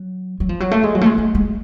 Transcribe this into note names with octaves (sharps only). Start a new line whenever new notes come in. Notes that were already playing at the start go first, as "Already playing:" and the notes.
Already playing: F#3
F#3
F3
F#3
A3
G#3
F#3
A3
G#3
A3
G#3